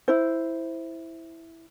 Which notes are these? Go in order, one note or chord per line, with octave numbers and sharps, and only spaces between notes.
E4 C5